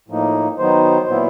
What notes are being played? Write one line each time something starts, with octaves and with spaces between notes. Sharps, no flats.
A2 F3 A#3 D#4
D#3 F#3 B3 D#4 C5
A#2 F#3 B3 E4